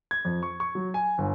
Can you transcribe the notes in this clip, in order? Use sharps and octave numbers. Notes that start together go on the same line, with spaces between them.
G#6
F2
C#6
C#6
F#3
G#5
G1